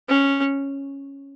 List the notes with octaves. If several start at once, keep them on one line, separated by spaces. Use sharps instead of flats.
C#4